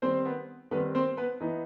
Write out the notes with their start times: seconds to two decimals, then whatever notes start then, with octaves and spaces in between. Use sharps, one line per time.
0.02 D#3 G3 C4 C5
0.25 B3 B4
0.71 D#3 G3 B3 C4 B4
0.95 C4 C5
1.17 B3 B4
1.40 E3 B3 D#4